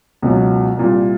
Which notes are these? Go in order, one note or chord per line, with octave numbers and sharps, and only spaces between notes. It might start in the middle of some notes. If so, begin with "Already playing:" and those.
C#2 B2 F#3
C2 A#2 G3